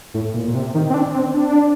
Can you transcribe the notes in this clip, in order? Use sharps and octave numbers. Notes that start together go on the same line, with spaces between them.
A2
A#2
A#2
C3
D#3
C4
D4
C4
D4